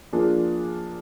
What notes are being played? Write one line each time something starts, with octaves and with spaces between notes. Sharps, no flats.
F3 A#3 D4 F4 G#4